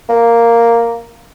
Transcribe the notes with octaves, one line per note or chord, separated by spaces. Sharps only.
A#3